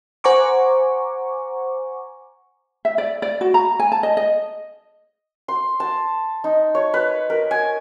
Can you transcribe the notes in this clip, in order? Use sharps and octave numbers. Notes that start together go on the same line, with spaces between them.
C5 F#5 G#5 A#5 C#6 D6
E5
D5
D5
F#4
A#5
G#5
A5
D#5
D#5
C6
A5
D#4
C#5
B4
A#4
G#5